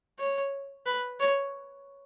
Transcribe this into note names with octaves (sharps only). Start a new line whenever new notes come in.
C#5
B4
C#5